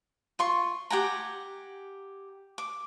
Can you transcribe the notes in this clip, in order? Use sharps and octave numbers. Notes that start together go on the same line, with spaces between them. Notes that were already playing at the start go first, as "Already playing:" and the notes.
F4 C6 C#6
G4 F#5 G#5 A#5
D6